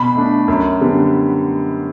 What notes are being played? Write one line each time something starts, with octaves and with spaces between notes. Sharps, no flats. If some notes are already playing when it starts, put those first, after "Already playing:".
Already playing: B2 B5
A3 D4
F#2
D3 G3 B3